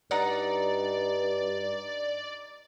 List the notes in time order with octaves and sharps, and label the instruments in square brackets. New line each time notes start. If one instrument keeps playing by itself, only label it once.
[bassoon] G2 [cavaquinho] D#4 F#5 [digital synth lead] D5